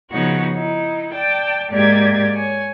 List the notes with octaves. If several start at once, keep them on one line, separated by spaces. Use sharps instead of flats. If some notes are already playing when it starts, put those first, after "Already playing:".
C#3 F3 B3 D#4 F#4 C#5
D#4 E4
D5 G5 A5
G#2 A#3 G4 D5 G#6
C#5 G#5